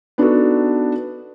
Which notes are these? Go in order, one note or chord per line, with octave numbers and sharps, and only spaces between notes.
B3 D4 D#4 F#4 A4